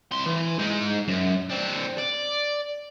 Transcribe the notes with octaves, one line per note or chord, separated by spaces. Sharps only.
C2 C6
E3
G#2 D#4
F#2
C4 D4
D5